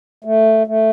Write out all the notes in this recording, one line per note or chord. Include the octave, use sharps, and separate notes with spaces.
A3
A3